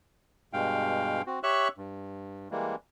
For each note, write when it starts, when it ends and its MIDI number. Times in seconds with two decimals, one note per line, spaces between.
0.53 1.22 43
0.53 1.22 47
0.53 1.22 56
0.53 1.22 77
0.53 1.22 79
1.27 1.39 60
1.27 1.39 66
1.43 1.68 67
1.43 1.68 73
1.43 1.68 76
1.43 1.68 85
1.43 1.68 88
1.43 1.68 90
1.78 2.48 43
2.51 2.75 52
2.51 2.75 55
2.51 2.75 56
2.51 2.75 58